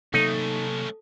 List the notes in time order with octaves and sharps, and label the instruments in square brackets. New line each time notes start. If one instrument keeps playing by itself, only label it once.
[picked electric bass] C3 F#3 A#3 [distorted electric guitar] A3 C#4 [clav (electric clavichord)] D#4 [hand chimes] A4